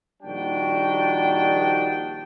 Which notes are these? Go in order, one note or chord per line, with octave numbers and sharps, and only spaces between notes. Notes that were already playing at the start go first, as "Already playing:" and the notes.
A#1 D#3 G3 D4 F#4 G5